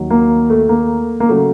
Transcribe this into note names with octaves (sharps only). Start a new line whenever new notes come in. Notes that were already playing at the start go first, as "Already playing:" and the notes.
Already playing: D#2 D#3 F#3
A#3
A3
A#3
A#3
C#3 F#3 A3